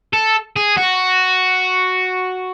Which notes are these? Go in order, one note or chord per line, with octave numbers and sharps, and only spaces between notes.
A4
G#4
F#4